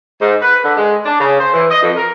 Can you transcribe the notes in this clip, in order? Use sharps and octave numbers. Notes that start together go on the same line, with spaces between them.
G#2
B4
D3
G#3
D4
C#3
C5
E3
D#5
F2
A#4